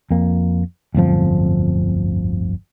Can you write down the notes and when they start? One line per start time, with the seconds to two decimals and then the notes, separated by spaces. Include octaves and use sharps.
0.11 F2 A#3
0.95 D1 G1 F2 F3